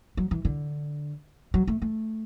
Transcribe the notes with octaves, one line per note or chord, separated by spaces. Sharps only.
F#3
E3
D3
F#3
A3
A3